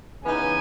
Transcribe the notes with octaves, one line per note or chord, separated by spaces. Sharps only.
C#3 E3 B3 D#4 G#5